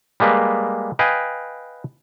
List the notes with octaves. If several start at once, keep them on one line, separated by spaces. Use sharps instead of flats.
G3 G#3 A#3 B4
B4 D#5 F5 G5 G#5